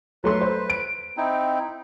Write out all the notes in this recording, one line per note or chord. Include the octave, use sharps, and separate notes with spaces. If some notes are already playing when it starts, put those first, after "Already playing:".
F#3 A3 B4 C6
C5
D7
C4 D#4 E4